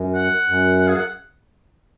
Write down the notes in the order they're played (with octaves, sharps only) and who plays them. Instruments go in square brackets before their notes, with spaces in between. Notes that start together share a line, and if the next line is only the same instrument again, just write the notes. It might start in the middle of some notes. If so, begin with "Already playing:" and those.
Already playing: [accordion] F#2
[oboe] F#5
[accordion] F#2
[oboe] F#5
G#4
F#5